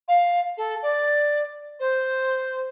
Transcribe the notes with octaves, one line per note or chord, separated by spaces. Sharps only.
F5
A4
D5
C5